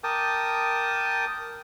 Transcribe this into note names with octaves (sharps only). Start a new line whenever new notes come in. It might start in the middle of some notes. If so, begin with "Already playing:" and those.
A#4 G5 A5 D6 D#6